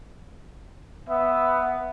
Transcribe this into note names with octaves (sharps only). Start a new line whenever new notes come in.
B3 E5